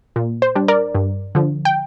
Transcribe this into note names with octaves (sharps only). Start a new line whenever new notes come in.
A#2
C5
G3 D4
A#4 D5
G2
D3 F3
G5